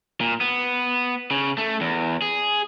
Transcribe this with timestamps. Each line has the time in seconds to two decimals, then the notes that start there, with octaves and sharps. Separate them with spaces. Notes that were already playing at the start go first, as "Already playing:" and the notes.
0.21 A#2
0.41 B3
1.31 C#3
1.58 A3
1.81 E2
2.22 G#4